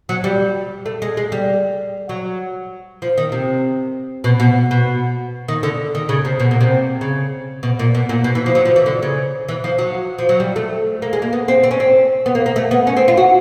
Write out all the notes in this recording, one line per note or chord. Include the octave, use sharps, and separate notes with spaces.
F#3
G3
A3
G#3
G#3
G3
F#3
F3
D#3
C3
B2
B2
B2
D#3
D3
D#3
C#3
C3
B2
A#2
C3
C#3
B2
A#2
B2
A#2
B2
E3
F3
F#3
F3
E3
D3
C#3
E3
F3
F#3
F3
F#3
G3
A3
A#3
G#3
A#3
B3
C4
C4
C#4
C4
B3
A#3
A#3
A3
B3
C#4
C4
F4
F#4